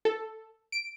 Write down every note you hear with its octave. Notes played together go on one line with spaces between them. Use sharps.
A4
D7